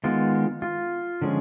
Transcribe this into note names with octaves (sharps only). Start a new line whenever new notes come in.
D#3 G#3 B3 F4
F4
D3 F3 G#3 C#4